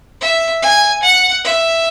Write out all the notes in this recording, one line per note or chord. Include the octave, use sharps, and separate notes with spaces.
E5
G#5
F#5
E5